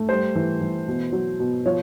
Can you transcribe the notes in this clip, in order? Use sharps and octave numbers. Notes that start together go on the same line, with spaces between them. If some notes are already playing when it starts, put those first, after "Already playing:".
Already playing: A3
G3 C5
E3
E3
B2
F#3
B2
F3 C#5